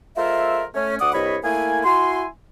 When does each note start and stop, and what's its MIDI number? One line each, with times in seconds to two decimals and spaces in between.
0.17 0.64 56
0.17 0.64 65
0.17 0.64 69
0.17 0.64 70
0.17 0.64 72
0.17 0.64 76
0.75 0.96 57
0.75 0.96 61
1.01 1.11 38
1.01 1.11 74
1.01 1.11 78
1.01 1.11 86
1.01 1.11 87
1.14 1.37 36
1.14 1.37 43
1.14 1.37 73
1.14 1.37 75
1.14 1.37 83
1.44 1.83 57
1.44 1.83 58
1.44 1.83 64
1.44 1.83 80
1.86 2.25 64
1.86 2.25 66
1.86 2.25 80
1.86 2.25 84